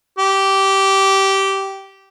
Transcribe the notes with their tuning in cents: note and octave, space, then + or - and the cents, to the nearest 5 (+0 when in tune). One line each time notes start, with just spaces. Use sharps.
G4 -15